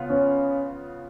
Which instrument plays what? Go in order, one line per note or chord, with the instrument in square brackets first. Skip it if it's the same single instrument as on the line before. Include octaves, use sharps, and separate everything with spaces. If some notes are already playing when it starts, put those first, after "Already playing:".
Already playing: [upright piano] C#3 B3 F4
[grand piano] C#4